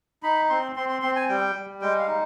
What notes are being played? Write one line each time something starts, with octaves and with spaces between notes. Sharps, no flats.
D#4 B5
C4 C6
C4 C6
C6
C4 C6
G#5
G3 G5
G3
G#3 G5
F5
D#4